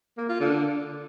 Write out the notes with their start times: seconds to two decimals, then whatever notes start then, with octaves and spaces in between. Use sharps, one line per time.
0.17 A#3
0.29 F4
0.40 D3